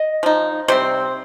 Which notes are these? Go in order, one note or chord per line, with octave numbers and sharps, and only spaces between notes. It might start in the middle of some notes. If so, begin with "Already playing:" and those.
Already playing: D#5
F3 D#4
C3 G3 C4 C5